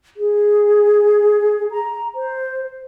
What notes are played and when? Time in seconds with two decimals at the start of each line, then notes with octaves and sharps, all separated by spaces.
0.17 G#4
1.71 A#5
2.15 C5